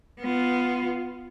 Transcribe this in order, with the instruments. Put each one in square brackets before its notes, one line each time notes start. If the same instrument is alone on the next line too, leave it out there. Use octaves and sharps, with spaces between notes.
[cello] B3 F4